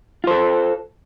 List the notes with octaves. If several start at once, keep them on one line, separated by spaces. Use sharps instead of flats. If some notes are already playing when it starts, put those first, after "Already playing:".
F4 A4 C5